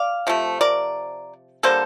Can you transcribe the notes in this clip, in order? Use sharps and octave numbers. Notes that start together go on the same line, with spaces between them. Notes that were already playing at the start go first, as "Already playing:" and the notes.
Already playing: D5 F5
C3 F3 A3
A#4 D5
D3 G3 A#3 A4 C5